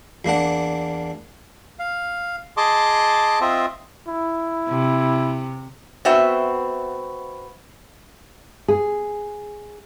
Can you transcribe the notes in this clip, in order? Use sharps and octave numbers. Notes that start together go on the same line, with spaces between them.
E2 A#3 D4 F#5
F5
G#4 D#5 A5 C6 D6
C4 F4 D#5 E5
E4
C3
B3 C4 F#4 E5
G#4